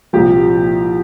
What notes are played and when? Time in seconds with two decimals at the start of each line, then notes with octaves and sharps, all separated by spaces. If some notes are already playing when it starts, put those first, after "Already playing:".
0.13 C2 A#2 F3 G4